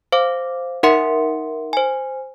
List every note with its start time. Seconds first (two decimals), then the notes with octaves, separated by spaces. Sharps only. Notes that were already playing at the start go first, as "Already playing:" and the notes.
0.12 C5 F5 D6
0.83 D#4 A#4 E5 F#5 C6 C#7
1.73 C5 G#5